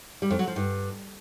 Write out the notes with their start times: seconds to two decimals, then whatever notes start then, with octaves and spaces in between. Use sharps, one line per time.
0.22 G3
0.31 F2
0.39 F#3
0.48 F3
0.56 G2